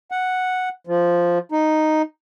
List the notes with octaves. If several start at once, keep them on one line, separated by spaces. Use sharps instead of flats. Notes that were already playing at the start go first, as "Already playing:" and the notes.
F#5
F3
D#4